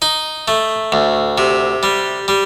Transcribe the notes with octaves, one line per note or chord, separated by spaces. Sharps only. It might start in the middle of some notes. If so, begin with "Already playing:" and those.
D#4
A3
D2
C3
G3
G3